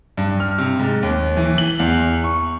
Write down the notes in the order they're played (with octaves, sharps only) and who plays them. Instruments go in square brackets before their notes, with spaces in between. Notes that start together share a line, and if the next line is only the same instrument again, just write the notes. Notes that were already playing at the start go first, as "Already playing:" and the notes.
[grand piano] G2
F6
C3
G#2
D#2
E3
F#7
E2
C#6